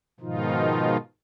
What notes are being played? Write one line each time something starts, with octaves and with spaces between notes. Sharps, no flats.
G#2 B2 D#3 F3 D#4 F4